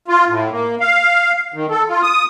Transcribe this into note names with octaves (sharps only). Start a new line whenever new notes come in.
F4
A2
A#3
F5
D#3
A4
F4
D#6